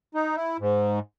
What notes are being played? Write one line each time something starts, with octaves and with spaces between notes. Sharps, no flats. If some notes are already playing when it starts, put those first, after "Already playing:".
D#4
E4
G#2